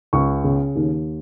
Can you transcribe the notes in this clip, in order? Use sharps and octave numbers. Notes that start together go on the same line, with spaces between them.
C#2 C#6
C#3
D#2